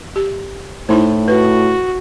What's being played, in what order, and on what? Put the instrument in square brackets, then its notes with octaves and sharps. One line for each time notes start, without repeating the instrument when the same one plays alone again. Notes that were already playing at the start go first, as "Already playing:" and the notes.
[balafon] G4
[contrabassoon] A2 [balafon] D#4 E4 C5
[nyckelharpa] F#4 [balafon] B4